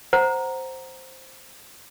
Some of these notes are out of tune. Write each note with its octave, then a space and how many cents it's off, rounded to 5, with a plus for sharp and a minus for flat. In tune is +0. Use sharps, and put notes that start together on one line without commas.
C5 +0 F#5 +0 A#5 +0